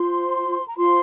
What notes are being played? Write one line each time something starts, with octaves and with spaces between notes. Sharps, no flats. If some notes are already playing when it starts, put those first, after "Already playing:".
Already playing: F4 C5 C6
A#5
F4 C5 C6